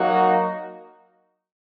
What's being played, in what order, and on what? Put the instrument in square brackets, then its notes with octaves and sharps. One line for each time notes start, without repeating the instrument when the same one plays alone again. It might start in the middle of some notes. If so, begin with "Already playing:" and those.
Already playing: [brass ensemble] F#3 A#3 D#4 F#4